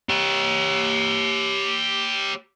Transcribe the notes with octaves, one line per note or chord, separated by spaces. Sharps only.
G4 C#5